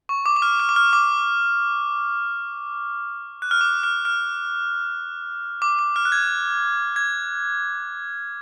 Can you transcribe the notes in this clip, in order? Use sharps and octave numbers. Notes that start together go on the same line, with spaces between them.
C#6
D6
D6
F6
F6
D6
F6
D6
F#6
F6
D6
F6
F6
D6
D6
F6
F#6
G#6
G#6